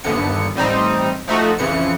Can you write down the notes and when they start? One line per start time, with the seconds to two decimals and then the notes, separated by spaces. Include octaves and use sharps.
0.04 G1 D#2 D3 B3 C#7
0.55 A1 G3 C4 D#4
1.28 F3 A3 D#4 F#4
1.59 F2 C#3 E3 C#7